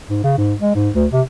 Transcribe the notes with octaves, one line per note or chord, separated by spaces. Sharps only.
G#2
C#3
G#2
G#3
G#2
D2
C3